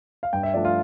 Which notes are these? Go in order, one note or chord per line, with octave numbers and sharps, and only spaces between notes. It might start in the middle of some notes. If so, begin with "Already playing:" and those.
F5
G2 G5
E5
F3 A3 D4 D5
F4